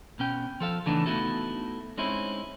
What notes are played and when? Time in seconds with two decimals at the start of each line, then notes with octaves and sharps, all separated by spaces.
0.19 B2 C#4 G5
0.60 F3 A4 F5
0.86 C#3 E3 A3 B3 D4 D#4
1.06 A3 B3 D#4 E4 F#4 A4
1.98 G#3 C4 C#4 D#4 E4